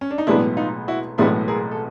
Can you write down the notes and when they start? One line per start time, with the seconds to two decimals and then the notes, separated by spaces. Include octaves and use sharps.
0.01 C#4
0.11 D4
0.18 D#4
0.27 B1 A2 E3 G#3 B3 D4 E4
0.57 D#4 F4
0.88 E4 F#4
1.18 B1 A2 E3 G#3 B3 D4 E4
1.48 G#4 A#4
1.71 A4